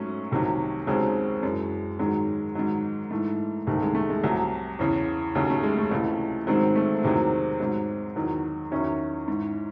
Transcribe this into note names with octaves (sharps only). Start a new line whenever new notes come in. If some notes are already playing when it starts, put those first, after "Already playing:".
Already playing: G#2 F#3 A3 C#4
C2 C3 D#3 F#3
D#2 C#3 F#3 G#3 C4
F#2 E3 G#3
G#2 D#3 F#3 G#3
G#2 D#3 F#3
G#2 E3 A3
C2 C3 D#3 A3
G#3
A3
G#3
C2 C3 F#3
E2 C#3 E3
D#2 C#3 F#3 A3
A3
G#3
A3
C#2 C3 E3
G#2 D#3 F#3 G#3 C4
A3
E2 C3 D#3 F#3 G#3 C4
G#2 F#3
E2 D#3 F#3
E2 D#3 F#3 C#4 E4
G#2 E3